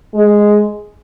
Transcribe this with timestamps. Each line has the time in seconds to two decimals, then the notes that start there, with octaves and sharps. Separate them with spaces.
0.14 G#3